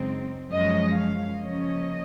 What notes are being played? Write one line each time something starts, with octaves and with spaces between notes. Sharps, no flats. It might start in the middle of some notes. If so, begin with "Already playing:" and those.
Already playing: F#2 C#3 G#3 C4 D#4
F#2 F3 G#3 C#4 D#5
F5
C#3 F3 A#3 C#4 D#5